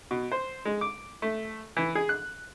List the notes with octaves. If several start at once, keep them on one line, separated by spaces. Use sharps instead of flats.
B2
C5
G#3
D6
A3
E3
G#4
F#6